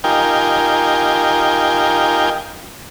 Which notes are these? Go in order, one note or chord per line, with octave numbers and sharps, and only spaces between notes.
D#4 F4 G4 A#4 G5 G#5